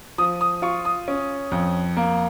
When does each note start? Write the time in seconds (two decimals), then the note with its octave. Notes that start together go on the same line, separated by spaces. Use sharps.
0.18 F3 D#6
0.41 D#6
0.62 F4 C#6
0.85 D#6
1.08 C#4
1.52 F2
1.97 A#3